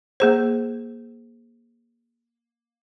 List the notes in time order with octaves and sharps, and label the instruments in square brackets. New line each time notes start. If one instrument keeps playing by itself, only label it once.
[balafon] A#3 G#4 C5